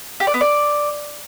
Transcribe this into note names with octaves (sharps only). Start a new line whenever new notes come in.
G4
D5
B3
D5